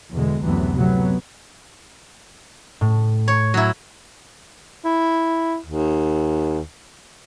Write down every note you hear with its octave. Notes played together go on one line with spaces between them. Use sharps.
E2 B2 D3 G#3
F#1 D2 C3 E3 F#3 B3
A2 C3 F#3 B3
A2
C#5
F#3 E4
E4
D#2